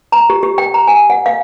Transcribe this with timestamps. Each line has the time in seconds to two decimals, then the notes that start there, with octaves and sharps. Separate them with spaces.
0.12 A#5
0.30 G4
0.43 G4
0.58 G5
0.74 A#5
0.87 G#5
1.10 F#5
1.26 F5